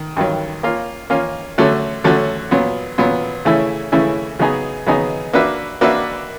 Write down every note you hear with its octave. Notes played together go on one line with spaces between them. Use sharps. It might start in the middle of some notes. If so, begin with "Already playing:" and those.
Already playing: D#3
G2 D#3 F#3
A#3 C#4 F4
A#3 C#4 F4
D3 F#3 A3 C#4 F#4
D3 F#3 A3 C#4 F#4
A#2 F#3 B3
A#2 F#3 B3
C#3 E3 A3 C#4 E4
C#3 E3 A3 C#4 E4
C#3 F#3 B3 D#4 G#4
C#3 F#3 B3 D#4 G#4
A#3 D4 F#4 B4 E5
A#3 D4 F#4 B4 E5